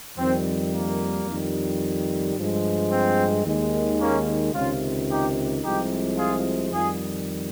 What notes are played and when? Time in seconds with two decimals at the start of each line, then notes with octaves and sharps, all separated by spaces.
0.17 F2 D#3 G3 C4
0.72 A#3
1.26 F2 D#3 G3
2.36 G2 F3 G#3
2.90 C4
3.45 D#2 D#3 G#3
4.00 A#3 C#4
4.54 C#2 C3 D#3 C#4 F4
5.08 D#4 G4
5.63 C2 C3 F3 G#3 D#4 G4
6.18 F4 G#4
6.72 F2 D#3 G3 F4 G#4